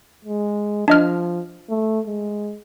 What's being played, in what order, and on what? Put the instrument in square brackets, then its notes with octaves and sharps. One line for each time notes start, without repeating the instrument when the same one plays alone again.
[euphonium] G#3
[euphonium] F3 [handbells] D4 D#5 F6
[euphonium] A3
G#3